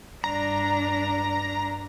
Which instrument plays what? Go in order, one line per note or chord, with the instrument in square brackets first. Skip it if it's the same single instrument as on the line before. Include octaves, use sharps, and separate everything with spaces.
[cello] G2 D4 [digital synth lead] A#5